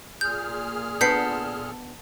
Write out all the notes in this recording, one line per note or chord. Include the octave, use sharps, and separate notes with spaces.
A#2 G#4 F6 G6
B3 D4 A4 G6 B6 C7